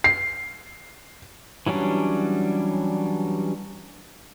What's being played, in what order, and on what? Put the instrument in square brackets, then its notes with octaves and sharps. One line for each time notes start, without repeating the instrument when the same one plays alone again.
[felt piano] C7
[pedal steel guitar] E3 F#3 G3 C#4 D4